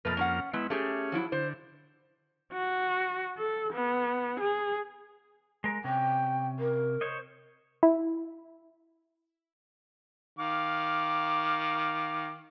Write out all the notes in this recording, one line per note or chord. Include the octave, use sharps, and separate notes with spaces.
F2 B2 A3 A#3 B4 F6
C#4 D4 F#5
G#3 B3 E4
A3 C#4 G4 G#4
F3 F#3 E4
D3 C5
F#4
A4
B3
G#4
G#3 A#4
C3 C#4 G5
A#4
C5 C#5 D#5
E4
D#3 F5 D6